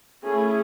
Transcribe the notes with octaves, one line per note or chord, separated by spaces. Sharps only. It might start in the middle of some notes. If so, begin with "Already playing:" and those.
A3 C#4 E4 G#4